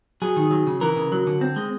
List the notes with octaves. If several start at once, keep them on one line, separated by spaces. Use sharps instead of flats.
F#3 G#4
D#3
F#3
C#3
E3 A#4
C#3
F#3
D3
C4
G#3